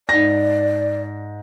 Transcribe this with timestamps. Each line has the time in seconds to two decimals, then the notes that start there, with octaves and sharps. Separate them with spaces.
0.09 G#2 D5 A#6